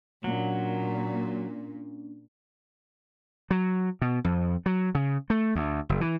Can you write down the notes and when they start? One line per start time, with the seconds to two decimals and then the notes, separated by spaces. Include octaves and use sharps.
0.24 A#2 F#3 A#3 C#4 D4
3.51 F#3
4.02 B2
4.24 F2
4.66 F#3
4.95 C#3
5.30 A3
5.55 D2
5.89 F#1
6.01 E3